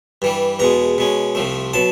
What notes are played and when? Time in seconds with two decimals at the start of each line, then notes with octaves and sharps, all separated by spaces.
0.22 G2 E3 G3
0.59 E2 B2 G#3 A#5
0.98 B2 G#3 C#4
1.35 C2 C3 F3 A3
1.74 B2 F#3 A5